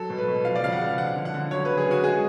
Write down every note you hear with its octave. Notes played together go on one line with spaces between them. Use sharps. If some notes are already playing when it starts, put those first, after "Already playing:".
Already playing: F#3 A4
B2
B4
B2
F3 F5
D5
C#3 F5
F#5
C#3
F3 F#5
D3
F#5
D3
F#3 C#5
C#3 B4
G#4
C#3
F#4
G#3 G#4